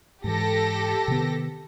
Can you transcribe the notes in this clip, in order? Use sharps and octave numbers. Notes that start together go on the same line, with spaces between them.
G#2 E3 G4 A4 A#6
C3 D#3 B3